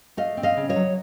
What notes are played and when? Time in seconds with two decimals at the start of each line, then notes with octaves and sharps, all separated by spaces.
0.17 A3 D#5 F5
0.37 C4
0.43 D#5 F5
0.57 C#3
0.69 C#5 D#5
0.76 F#3